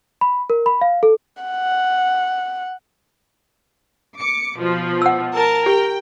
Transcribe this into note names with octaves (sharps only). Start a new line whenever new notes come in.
B5
A#4
B5
F5
A4
F#5
D6 C#7
B2 F3
F#5 E6
A#4 A5
G4 G5